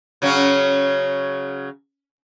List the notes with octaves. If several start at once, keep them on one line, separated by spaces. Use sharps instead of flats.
C#3 F#3 C#4